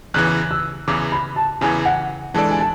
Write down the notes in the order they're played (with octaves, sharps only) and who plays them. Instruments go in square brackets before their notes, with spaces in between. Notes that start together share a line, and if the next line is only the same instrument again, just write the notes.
[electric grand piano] E2 C#3 E3 [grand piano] F#6
[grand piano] E6
[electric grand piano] E2 C#3 E3 [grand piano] D6
[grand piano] B5
A5
[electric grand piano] E2 C#3 E3 [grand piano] G#5
[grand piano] F#5
[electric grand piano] E3 G#3 D4 A4 D5 [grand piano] A5
[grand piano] G#5
A5